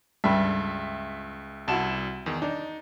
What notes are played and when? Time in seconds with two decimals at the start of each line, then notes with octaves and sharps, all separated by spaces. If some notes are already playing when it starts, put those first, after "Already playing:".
0.24 C#2 G2 D3 E5 B5
1.68 C2 E4 F#4 A5 E7
2.26 E2 D#3
2.42 D4 D#4